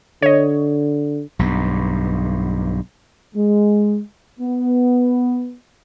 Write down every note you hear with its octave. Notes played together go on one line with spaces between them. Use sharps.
D3 C#5 D#5
B1 G2
G#3
B3